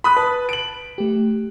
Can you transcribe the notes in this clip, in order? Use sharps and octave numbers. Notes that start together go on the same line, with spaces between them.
B5 D#6 F#6
B4 A5
D7 F#7
A3 G4